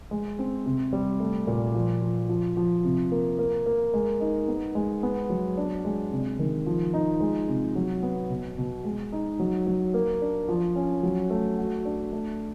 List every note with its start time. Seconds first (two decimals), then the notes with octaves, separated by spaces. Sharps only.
0.11 G#3
0.39 C4
0.66 C3
0.93 G3
1.20 A3
1.47 A#2
1.75 F3
2.02 F3
2.29 F3
2.57 F3
2.85 C3
3.12 A#3
3.39 A#3
3.66 A#3
3.94 G#3
4.21 D#4
4.48 B3
4.75 G#3
5.03 B3
5.30 F#3
5.57 D4
5.85 G#3
6.12 C3
6.39 D#3
6.66 F3
6.94 D#4
7.21 G#3
7.48 C3
7.76 F#3
8.03 B3
8.30 B2
8.58 B2
8.85 G#3
9.12 D#4
9.39 F#3
9.67 F#3
9.94 A#3
10.22 D4
10.49 F3
10.76 C#4
11.03 F#3
11.30 A3
11.58 F#4
11.85 D4
12.13 A3